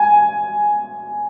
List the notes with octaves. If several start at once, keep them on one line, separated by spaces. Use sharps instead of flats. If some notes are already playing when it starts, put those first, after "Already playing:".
Already playing: G#5